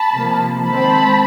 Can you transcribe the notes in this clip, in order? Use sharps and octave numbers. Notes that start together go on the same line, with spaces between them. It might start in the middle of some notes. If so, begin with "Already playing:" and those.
Already playing: A5 B5
C3 F3 A#3
D#3 G#3 C4 A5 B5